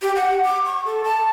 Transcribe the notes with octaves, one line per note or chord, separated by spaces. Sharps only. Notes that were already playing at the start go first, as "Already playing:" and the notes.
G4
F#5
D6
C#6
A4
A5